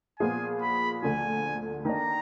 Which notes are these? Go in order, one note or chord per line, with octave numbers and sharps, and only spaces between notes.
A#2 F3 B3 F4 G#4 G#5
B5
D2 D3 F3 G#5
D#3 A#3 D4 A#5